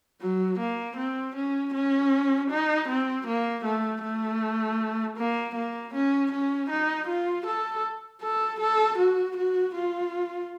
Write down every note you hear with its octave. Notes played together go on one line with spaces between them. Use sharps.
F#3
A#3
C4
C#4
C#4
D#4
C4
A#3
A3
A3
A#3
A#3
C#4
C#4
D#4
F4
A4
A4
A4
F#4
F#4
F4